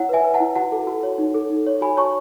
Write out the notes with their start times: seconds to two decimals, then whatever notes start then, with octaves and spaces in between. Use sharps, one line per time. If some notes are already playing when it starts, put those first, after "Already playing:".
Already playing: E4 C#5 F#5
0.09 B4 E5 G#5
0.24 B4
0.34 F#5 A5
0.40 E4
0.56 F#4 F#5 A5
0.72 A4
0.87 F#4
1.03 C#5
1.18 D#4
1.34 A4
1.50 D#4
1.67 C#5
1.81 F#4 G#5 B5
1.97 C#5 A5 C#6